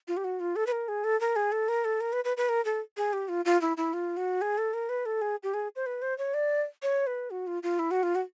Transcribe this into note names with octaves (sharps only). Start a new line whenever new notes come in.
F4
G4
F#4
F4
A4
B4
A#4
G#4
A4
A#4
G#4
A4
A#4
A4
A#4
B4
B4
B4
A#4
A4
G#4
G4
F4
F4
E4
E4
F4
F#4
G#4
A4
A#4
B4
A4
G#4
G4
G#4
C5
B4
C5
C#5
D5
C#5
B4
F#4
F4
F4
E4
F#4
F4
F#4